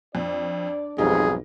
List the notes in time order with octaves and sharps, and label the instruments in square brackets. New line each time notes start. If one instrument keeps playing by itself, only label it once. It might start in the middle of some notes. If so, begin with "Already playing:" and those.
[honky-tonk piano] F2 [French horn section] D4 D5
[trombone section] B1 F2 G#2 [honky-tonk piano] G3 D#4 [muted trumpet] G#4